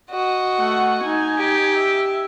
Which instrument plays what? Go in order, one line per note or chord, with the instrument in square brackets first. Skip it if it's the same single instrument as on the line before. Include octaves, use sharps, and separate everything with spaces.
[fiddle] F#4 D#5
[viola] A3 F#5
D#4 G#5
[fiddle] G4
[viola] E5